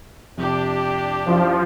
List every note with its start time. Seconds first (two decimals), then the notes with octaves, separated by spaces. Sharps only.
0.38 F2 C3 D4 G4
1.26 F#2 F3 E4 D5